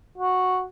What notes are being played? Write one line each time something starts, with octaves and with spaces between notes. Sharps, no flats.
F#4